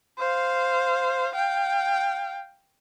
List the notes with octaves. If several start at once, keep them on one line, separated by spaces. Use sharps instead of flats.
C5 F5
F5 G5